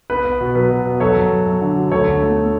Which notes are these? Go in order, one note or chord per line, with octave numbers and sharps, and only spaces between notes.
B3 B4
B3
B2
F#3 B4
B2
B3
F#3 A4 C#5
F#2
F#2
F#2
D3
F#3
D2 A4 C#5
D3
A3
A3